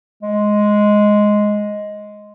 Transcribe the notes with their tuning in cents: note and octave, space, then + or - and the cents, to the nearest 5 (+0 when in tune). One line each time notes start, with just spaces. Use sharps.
G#3 +5